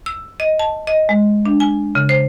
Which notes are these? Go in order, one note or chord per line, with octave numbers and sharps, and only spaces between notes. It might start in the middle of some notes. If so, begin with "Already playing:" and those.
E6
D#5
A5
D#5
G#3
D4
G#5
C#3
C5